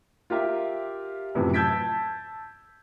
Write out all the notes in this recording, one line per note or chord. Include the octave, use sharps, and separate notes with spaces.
F4 G4 A#4 E5
F#2 A2 C3 E3 F3
A5 E6 G6 G#6 B6 D7